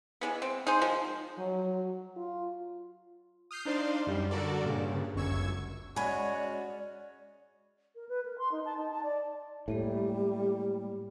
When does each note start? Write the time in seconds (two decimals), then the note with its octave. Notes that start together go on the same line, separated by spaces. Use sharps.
0.21 E3 G#3 B3
0.42 C4
0.67 D#4 G#4 C5
0.81 D#3 F3 G#3
1.39 F#3
2.17 F4
3.51 D#6 F6 G6 C7
3.65 D4 D#4 C5 D5 F5 C6
4.07 F#2 G3
4.31 D3 F#4 A4 A#4 D5
4.64 G2 A#2 C#3
5.15 G1 C#2 F#2 C#6 E6 G#6
5.96 G#3 C#4 F#4 D5 G#5 B5 G#6
7.95 A#4
8.09 B4
8.25 A#4
8.38 C6
8.52 D#4
8.65 A5
8.78 D#4
8.91 A5
9.03 D5
9.68 A2 G3 G#3 A#3 G4